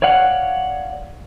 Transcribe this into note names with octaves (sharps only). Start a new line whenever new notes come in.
C#5 D5 F5 F#5